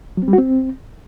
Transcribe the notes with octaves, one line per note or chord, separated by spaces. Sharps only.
F#3
C4
G3
F#4
C4